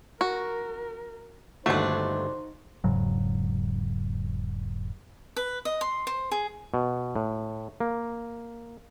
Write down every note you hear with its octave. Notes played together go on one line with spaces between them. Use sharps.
F#4 A#4
G1 D#2 A3 D4 D#4 F#4 C5
E1 G#2 C#3 F#3
B4
D#5
C6
C5
G#4
B2
A2
A#3